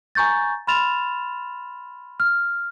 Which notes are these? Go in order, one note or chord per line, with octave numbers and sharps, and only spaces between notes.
G#5 A#5 C#6 G6 A6
B5 C6 F6 A6 E7 F7
F6